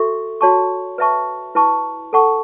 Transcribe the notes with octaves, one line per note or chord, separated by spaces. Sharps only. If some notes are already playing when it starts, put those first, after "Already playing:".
Already playing: F#4 A4 E5 C#6
F#4 C#5 A5 C#6
B4 E5 A5 C#6
E4 B4 A5 C#6
A4 F#5 A5 C#6